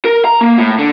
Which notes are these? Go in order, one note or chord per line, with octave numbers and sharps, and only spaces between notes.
A#4
A#5
A#3
A2
D3